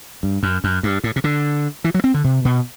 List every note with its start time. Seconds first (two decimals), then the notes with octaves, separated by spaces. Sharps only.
0.23 G2
0.43 F#2
0.64 F#2
0.83 G2
1.04 A2
1.16 C3
1.24 D3
1.84 E3
1.94 F#3
2.04 C4
2.14 D3
2.24 C3
2.45 B2